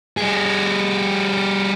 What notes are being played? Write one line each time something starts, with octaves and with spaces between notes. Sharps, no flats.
G3 G#4